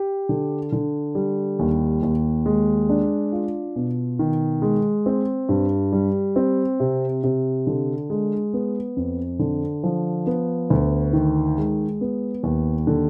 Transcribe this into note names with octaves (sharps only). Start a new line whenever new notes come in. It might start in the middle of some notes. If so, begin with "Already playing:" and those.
Already playing: G4
D3
D3
G3
D#2
D#2
G#3
D4
F4
B2
D#3
G#3
C4
G2
G3
C4
C3
C3
D3
G#3
B3
F2
D3
F3
B3
D2
D#3
G#3
B3
D#2
D3